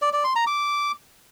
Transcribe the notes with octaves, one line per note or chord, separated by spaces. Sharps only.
D5
D5
C6
A#5
D6